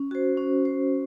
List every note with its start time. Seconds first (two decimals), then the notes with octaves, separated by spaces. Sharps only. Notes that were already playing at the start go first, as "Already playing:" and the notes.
Already playing: C#4
0.11 F#4 C5
0.37 C#4
0.65 F#4 C5